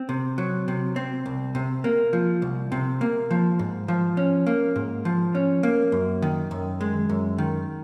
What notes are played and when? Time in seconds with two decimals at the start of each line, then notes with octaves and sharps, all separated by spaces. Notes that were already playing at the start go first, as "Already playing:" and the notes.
Already playing: C4
0.09 C3
0.38 F#3
0.68 C3
0.96 C4
1.26 C2
1.55 C3
1.84 A#3
2.13 F3
2.42 C2
2.72 C3
3.01 A#3
3.31 F3
3.59 G#2
3.88 F3
4.17 C#4
4.47 A#3
4.76 G#2
5.05 F3
5.35 C#4
5.63 A#3
5.92 F#2
6.22 D#3
6.51 F#2
6.81 G#3
7.09 F#2
7.38 D#3